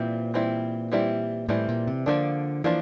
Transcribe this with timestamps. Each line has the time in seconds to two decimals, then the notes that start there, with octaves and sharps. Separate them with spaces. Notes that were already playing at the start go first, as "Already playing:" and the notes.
Already playing: A#2 E3 G3 C4 E4
0.34 E3 G3 C4 E4
0.92 E3 G3 C4 E4
1.49 A2 E3 G3 C4 E4
1.69 A#2
1.87 C3
2.06 D3 F3 A#3 D4
2.64 E3 F3 A#3 D4